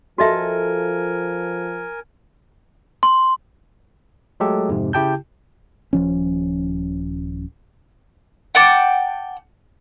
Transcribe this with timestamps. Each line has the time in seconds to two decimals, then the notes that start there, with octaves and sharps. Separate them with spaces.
0.18 F3 F4 F#4 A4 A#4 D#5 E5 G#5
3.03 C6
4.40 F#3 G#3 A3 G4 A4
4.69 F2 G#2 C3
4.93 C#3 E4 G4 G5 A5 G6
5.93 D#1 F3 C#4
8.55 F#5 G5 A5 D6